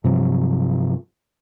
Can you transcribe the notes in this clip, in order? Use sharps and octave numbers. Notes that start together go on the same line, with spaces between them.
G2 C3 F3 F#3